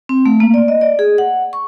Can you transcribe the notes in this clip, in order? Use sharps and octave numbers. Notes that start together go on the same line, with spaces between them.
C4
A3
A#3
D5
D#5
D5
G#4
F#5
C#6